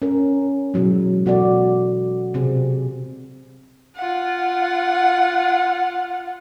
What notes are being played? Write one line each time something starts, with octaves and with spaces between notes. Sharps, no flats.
C#4 A#4
B2 E3 F#3 G#3
B2 F#4 A4 D5
C3 C4 G#4
F4 F#5